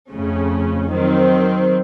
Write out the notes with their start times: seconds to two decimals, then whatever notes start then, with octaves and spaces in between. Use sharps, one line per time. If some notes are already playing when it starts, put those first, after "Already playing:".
0.10 F2 C#3 A3 C#4
0.91 D#3 F#3 C4